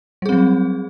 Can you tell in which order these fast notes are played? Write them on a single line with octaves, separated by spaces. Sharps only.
G3 G#4 C4 F#3